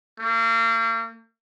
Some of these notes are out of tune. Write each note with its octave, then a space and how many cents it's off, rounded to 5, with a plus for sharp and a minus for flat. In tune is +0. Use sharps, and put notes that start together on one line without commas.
A#3 -40